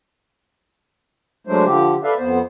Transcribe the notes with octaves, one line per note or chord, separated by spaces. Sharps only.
F#3 G#3 A3 D4 C5
D3 F3 G4
A4 B4 D5 E5 F5
F2 B3 C5